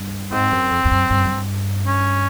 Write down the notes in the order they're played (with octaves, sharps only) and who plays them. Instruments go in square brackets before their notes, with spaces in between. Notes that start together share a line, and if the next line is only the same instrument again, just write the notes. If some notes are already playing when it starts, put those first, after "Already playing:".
Already playing: [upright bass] G2
[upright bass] G#2 [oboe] C4
[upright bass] F#2
F2
F2
F#2
G2
F#2
G2
[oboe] C#4